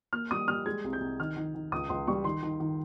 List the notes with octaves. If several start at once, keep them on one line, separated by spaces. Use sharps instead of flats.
A#3 F6
G3 D#6
G3 F6
G#3 G#6
C2
G6
C2
D#3 F6
D#3
D#3
C#2 D#6
C#2 C6
G3 C#6
D#3 C6
D#3
D#3